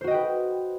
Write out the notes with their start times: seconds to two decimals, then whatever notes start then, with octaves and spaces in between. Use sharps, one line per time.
0.01 C5
0.04 F#4
0.07 D#5
0.11 G5
0.14 B4